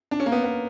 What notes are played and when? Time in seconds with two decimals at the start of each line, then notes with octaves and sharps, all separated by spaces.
0.11 D4
0.20 C#4
0.26 A#3
0.32 B3
0.44 B3